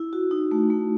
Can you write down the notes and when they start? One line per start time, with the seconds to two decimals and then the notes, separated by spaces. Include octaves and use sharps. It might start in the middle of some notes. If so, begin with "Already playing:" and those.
Already playing: E4
0.13 F#4
0.31 D#4
0.51 A3
0.70 A3